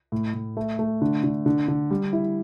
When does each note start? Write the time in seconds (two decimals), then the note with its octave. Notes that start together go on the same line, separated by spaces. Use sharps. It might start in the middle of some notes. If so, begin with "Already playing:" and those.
0.12 A2
0.34 A2
0.57 A3
0.79 A3
1.02 D3
1.24 D3
1.46 D3
1.68 D3
1.91 G3
2.13 E4